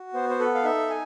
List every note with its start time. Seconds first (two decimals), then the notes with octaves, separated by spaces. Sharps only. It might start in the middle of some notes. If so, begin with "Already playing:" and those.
Already playing: F#4
0.14 B3 C5
0.29 C5
0.39 A4 B4
0.55 F5
0.64 D#4 E5
0.90 G#5